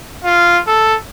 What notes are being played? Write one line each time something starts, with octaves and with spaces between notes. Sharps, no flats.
F4
A4